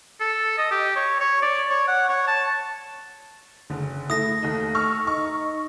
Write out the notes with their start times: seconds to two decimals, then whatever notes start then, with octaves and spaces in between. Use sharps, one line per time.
0.20 A4
0.58 D#5
0.71 G4
0.96 C#5
1.20 C#5
1.42 D5
1.70 C#5
1.88 F#5
2.09 C#5
2.27 A5
3.70 F#1 D3
4.10 A3 E4 D#6 A#6
4.43 D#2 A3 D#4
4.75 C#6 E6 F6
5.07 D#4 C#6